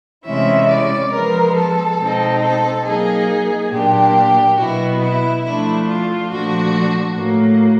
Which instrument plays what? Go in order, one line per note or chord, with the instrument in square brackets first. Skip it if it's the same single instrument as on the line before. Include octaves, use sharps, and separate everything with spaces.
[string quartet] C3 E3 G#3 C#4 E4 E5
D5
F3 G#3 B3 A#4
A4
B2 G#3 C4 D#4
A4
F#3 A#3 D#4 G#4
A#2 F#3 A#3 D4 G4
B2 F#3 B3 E4 F#4
E4
F3 A3 D4 E4
F4
A#2 F3 A3 D4 F#4
A2 F#3 A#3